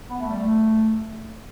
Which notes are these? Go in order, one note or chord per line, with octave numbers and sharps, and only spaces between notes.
B3
A3
G3
A3